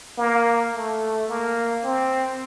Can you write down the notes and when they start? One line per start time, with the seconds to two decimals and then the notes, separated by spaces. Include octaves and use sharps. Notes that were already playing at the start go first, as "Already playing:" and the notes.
0.18 A#3
0.74 A3
1.28 A#3
1.84 C4